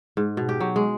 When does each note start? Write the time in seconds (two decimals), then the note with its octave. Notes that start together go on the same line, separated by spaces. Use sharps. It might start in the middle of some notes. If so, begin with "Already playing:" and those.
0.17 G#2
0.37 B2
0.49 G4
0.60 F#3
0.76 G#3